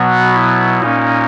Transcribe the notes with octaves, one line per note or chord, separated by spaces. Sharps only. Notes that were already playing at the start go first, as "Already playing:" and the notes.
Already playing: B2 F#3 B3 F#4
E4
A#2 A#3 C#4 D#4